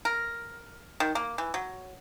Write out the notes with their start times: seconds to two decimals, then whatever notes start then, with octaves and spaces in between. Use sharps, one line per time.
0.05 A#4
1.00 D#3
1.15 A#3
1.38 E3
1.54 F#3